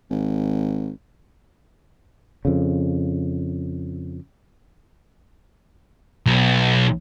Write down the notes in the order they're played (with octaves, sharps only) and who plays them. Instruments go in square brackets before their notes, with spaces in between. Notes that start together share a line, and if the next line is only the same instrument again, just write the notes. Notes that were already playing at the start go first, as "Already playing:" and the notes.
[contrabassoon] G#1
[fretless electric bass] F2 C#3
[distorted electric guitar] B1